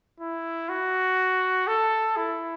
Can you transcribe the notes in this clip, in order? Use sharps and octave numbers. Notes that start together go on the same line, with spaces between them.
E4
F#4
A4
E4